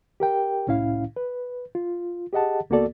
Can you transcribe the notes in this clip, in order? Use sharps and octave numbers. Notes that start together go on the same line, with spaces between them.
G4 A#4 G5
C2 A2 C#4 E4 F5
B4
F4
G4 G#4 D#5 F#5 A5
C#2 A#3 B3 F#4 A4 D5